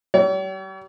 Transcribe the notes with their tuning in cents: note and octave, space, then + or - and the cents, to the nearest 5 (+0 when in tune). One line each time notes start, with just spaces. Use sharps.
G3 -40 C#5 +45